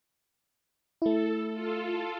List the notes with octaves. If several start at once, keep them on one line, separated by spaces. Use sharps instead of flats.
A3 E4 A4
F4 A4